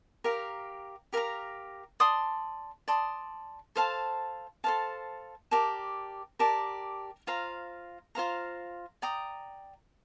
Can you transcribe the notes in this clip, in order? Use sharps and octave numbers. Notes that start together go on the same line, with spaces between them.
G4 A#4 F5 A#5
G4 A#4 F5 A#5
D5 A5 C6 D#6
D5 A5 C6 D#6
A4 C5 F5 A5
A4 C5 F5 A5
G4 A#4 D5 A5
G4 A#4 D5 A5
F4 C5 F5 A#5
F4 C5 F5 A#5
D5 G5 A#5 D#6